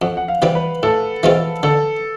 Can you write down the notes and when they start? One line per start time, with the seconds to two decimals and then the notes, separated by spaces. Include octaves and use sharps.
0.02 F2 F#5
0.17 F#5
0.28 F5
0.42 C3 E3 G3
0.55 B4
0.83 A2 A4
1.23 E3 G#3 C4 F4
1.63 D3 A4